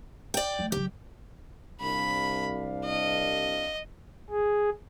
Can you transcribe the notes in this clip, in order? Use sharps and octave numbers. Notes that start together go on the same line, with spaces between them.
D5 G5
F3 A3
C#3 F#3 G4
C2 D4 F5 B5
D#5
G#4